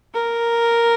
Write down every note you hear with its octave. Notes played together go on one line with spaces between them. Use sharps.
A#4